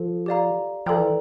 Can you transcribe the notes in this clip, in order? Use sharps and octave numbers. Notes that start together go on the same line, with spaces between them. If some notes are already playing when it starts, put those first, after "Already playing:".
Already playing: F3 A4
G4 D5 F5 A#5
F3 A4 D5 G5 A#5
E3